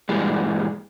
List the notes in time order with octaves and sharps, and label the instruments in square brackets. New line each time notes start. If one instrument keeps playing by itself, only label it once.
[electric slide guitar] G2 A#2 E3 G3 G#3